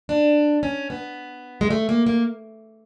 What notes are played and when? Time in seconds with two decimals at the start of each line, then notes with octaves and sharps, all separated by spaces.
0.09 D4
0.63 C#4
0.90 B3
1.61 G#3
1.70 A3
1.89 A#3
2.06 A#3